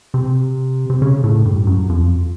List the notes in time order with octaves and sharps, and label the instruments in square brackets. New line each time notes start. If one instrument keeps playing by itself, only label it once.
[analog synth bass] C3
C3
C#3
A2
G2
F#2
F2